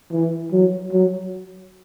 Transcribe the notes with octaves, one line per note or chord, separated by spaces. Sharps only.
E3
F#3
F#3